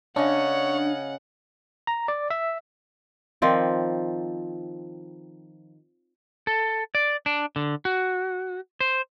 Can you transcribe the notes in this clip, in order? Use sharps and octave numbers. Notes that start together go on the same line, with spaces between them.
C#3 D4 C#5 D#5 F#5
A#5
D5
E5
D#3 F3 C4 D5
A4
D5
D4
D3
F#4
C5